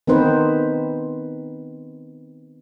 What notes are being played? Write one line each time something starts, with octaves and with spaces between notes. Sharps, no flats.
D#3 B3 C4 D#4 B4 C5